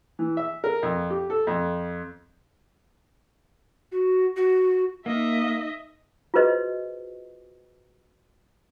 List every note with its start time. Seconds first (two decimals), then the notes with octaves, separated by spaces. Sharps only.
0.19 E3
0.37 E5
0.64 A#4
0.83 F2
1.10 G4
1.30 A4
1.47 F2
3.92 F#4
4.36 F#4
5.06 A#3 D#4 D#5 E5
6.34 F4 F#4 G#4 B4 C5 D#5